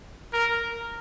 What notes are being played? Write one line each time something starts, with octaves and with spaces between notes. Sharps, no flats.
A#4